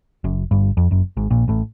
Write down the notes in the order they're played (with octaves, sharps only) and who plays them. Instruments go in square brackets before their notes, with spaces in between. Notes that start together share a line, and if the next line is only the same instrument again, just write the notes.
[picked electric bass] F#1 F#2
G1 G2
F2
F#1 F#2
G#1 G#2
A#1 A#2
A1 A2